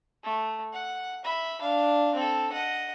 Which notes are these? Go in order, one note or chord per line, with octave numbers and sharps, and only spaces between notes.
A3
F#5
E5 B5
D4 F5
C4 A4
D#5 F#5